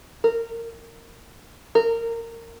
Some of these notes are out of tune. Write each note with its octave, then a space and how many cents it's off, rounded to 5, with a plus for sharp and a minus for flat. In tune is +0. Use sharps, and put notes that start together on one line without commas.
A#4 -20
A#4 -20